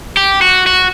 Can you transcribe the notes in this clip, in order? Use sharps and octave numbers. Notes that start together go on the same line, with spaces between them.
G4
F#4
F#4